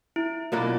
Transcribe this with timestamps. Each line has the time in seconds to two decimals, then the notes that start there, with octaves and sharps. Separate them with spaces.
0.16 E4
0.52 B2 F#3 A#3 D4 F4